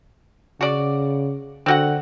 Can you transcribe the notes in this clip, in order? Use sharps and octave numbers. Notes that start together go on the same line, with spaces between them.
C#3 F#4 D5
D3 C4 F#4 F#5